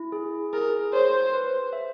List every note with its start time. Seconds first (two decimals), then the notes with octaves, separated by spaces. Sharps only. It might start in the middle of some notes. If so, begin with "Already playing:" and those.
Already playing: E4
0.12 G#4
0.53 G#4 A#4
0.93 C5 C#5
1.33 B4
1.73 E5